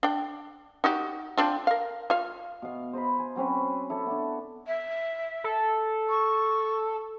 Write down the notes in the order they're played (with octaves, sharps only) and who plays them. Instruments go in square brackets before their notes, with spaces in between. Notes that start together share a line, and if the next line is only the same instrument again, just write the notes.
[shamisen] D4 G5
D#4 F#4 G4
C4 D4 F4
A#4 F5
F4 F5
[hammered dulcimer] B2 F5
C5 D#5 A#5 B5
G#5
F#3 C4 C#4 B4
E4 A4 C#5 D5
B3 D4
[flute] E5
[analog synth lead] A4
[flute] C#6